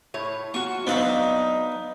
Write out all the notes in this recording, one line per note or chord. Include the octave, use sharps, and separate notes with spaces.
A2 E4 C#5
F4 F#4 C#6
F#3 B3 C4 D4 D#4 B4 F5